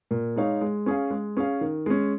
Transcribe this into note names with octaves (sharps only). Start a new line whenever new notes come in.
A#2
G#3 D#4 C#5 F5
G#3
C#4 G#4 F5
G#3
C#4 G#4 F5
D#3
G#3 C#4